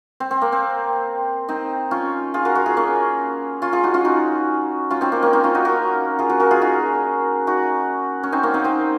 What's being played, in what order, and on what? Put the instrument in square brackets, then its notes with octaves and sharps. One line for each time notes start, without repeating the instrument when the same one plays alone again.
[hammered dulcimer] C4
C4
A#3
C4
C4 D#4
C#4 F4
F4 G#4
F#4 A#4
F#4 A#4
F4 G#4
A#3 C#4
C#4 F4
F4 G#4
D#4 F#4
C#4 F4
D#4 F#4
C#4 F4
C4 D#4
A#3 C#4
A#3 C#4
C4 D#4
C#4 F4
D#4 F#4
F#4 A#4
F4 G#4
F#4 A#4
F#4 A#4
F4 G#4
D#4 F#4
D#4 F#4
C#4
C4 D#4
A#3 C#4
C4 D#4
C4 D#4